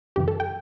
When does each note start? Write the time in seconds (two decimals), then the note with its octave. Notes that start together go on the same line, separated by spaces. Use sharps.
0.16 F#2 C#3 E3 G4
0.28 A4
0.40 G5